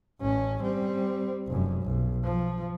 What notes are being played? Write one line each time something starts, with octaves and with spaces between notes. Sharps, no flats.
A1 C#4
G3 C4
F1 F#2
B1
F3